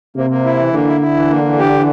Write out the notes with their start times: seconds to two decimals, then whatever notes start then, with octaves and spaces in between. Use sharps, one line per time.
0.15 C3 A#3
0.30 A#3
0.45 E4
0.59 E3
0.73 D3 A#3
0.87 E4
1.01 E4
1.15 E3
1.30 A#3
1.44 E3
1.59 G4
1.73 E3